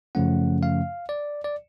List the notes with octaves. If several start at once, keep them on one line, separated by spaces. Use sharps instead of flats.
F#2 C#3 F3 A3 C#4 F#5
F5
D5
D5